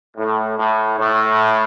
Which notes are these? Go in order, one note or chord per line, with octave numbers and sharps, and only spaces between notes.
A2
A2
A2